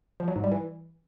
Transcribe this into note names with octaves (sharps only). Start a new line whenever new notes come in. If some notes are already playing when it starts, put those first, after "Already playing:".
F3
F#3
G#2
G3
E3